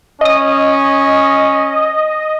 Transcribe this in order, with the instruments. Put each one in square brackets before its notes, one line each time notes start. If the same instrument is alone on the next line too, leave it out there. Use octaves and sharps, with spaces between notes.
[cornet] C#4 [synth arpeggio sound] D#5 D#6